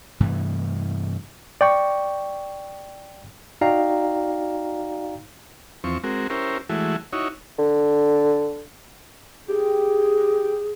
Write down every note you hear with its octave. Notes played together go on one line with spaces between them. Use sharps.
G2 C3 E3 A3
D5 G5 C#6
D#4 F#4 D5 F5 G5 A#5
E2 F3 C4 C#6
G#3 C4 F#4 A#4
C#4 E4 G4 A#4 C5
E3 G#3 A3 E4 F#4
D#4 E4 F#4 C#5
D3
G4 G#4